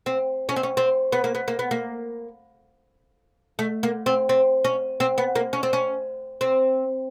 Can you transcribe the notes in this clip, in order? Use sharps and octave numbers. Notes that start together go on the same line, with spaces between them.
C4
C#4
C4
C#4
C4
B3
A#3
B3
A#3
B3
A#3
A3
A#3
C4
C4
C#4
C4
B3
A#3
C#4
C4
C#4
C4